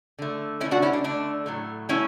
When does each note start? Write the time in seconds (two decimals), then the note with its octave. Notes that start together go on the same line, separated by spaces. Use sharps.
0.19 D3 A3
0.60 A3 C#4 E4
0.65 D3
0.71 D4 F#4
0.82 C#4 E4
0.93 D4
1.04 D3 A3 D4
1.46 A2 F#3 A3
1.89 F#3 A3 C#4 E4